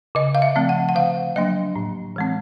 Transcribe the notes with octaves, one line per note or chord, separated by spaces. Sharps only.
C#3 D#5
F5
E5
F3 A3 C4
F#5
F#5
D3 F5
F#3 A#3 D4 D#5
A2
E3 G#3 C4